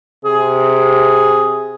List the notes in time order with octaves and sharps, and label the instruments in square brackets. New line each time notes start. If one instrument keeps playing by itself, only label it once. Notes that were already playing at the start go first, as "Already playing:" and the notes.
[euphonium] C3 [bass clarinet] G#4